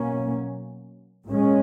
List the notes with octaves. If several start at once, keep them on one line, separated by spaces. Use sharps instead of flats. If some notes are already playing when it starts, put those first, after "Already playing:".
Already playing: B2 F#3 A#3 C#4
A#2 G#3 C#4